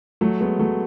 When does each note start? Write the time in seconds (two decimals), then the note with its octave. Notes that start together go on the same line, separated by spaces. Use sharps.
0.21 F#3 A3
0.41 G#3 B3
0.59 F#3 A3